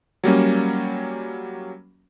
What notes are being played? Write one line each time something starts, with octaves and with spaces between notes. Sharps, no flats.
F#3 G3 A#3 C#4